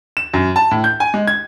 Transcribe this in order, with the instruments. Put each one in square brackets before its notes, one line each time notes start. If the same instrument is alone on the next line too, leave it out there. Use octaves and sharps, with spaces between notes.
[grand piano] E7
F#2
A5
A2
G6
G#5
G#3
G#6